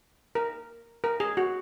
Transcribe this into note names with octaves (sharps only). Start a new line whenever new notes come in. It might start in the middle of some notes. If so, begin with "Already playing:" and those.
A#4
A#4
G#4
F#4